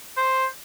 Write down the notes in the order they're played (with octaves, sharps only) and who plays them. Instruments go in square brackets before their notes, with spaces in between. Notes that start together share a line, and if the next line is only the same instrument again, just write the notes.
[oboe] C5